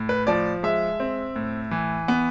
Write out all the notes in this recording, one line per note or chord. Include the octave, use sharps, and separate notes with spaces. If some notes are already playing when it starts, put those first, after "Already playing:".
Already playing: A2
B4
F3 D5
G#3 E5
C4
A2
E3
B3